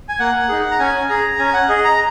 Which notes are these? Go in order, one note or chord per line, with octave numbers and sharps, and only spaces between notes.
G#5
A#3 F#5
D#4 G#4
A#5
C#4 G#5
G#4 A#5
C#4 G#5
F#5
G#4 D#5
A#5